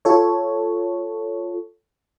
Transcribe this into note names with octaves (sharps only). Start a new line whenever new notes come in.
F4 A4 C#5